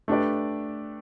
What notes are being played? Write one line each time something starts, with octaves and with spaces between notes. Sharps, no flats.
A3 D4 G4 B4 D5